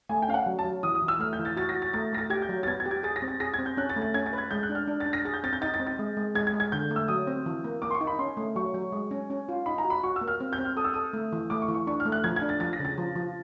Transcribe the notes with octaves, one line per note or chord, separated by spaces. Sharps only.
A3 G#5
G5
C#4 F5
F#5
F#3
A5
F#3
E3 D#6
D#6
E3
E6
A3 F6
G6
E3
A6
F#4 A6
A#6
F#4
A6
A3 A6
A3 A#6
A6
G4 G#6
G6
F#3
A6
B3 G#6
G#6
G4
G#6
G#4 A6
A#6
C4
A6
G#4 A#6
G#6
C4
G6
C#4 F#6
A6
A3
A6
C#4 G#6
A6
B4
G#6
G#3 G6
F#6
D4
F6
D4
A6
D4
A#6
G#4 A6
G6
C4 A6
G6
D#4 A6
A6
C4
A6
G#3
G#3
G#3 G#6
G#6
G#3
G#6
D3 G6
A3
E6
F#3 D#6
C4
E3
A#3
A#3 D6
C6
C#6
D#4
B5
C#4 C6
A3
F#3 C#6
F#3
G#3
C#4
C#4
F4
D#4 B5
A#5
F#4
B5
F#4 C#6
E6
A#3
F6
C4
G6
C4
F6
A4 D#6
E6
A4 D#6
A3
E3
A3 D6
C#6
E3
C#6
D4 C#6
F6
A3
F#6
F3 G#6
G#6
D4
A6
F3 A6
A#6
C#3
A6
F3
F3